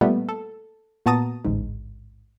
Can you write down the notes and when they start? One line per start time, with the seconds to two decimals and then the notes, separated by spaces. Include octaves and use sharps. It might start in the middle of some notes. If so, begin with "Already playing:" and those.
0.01 A#2 G3 A3 B3
0.29 A4
1.06 A#2 B3 F#4 A5 A#5 D#6
1.45 A1 D2 G#2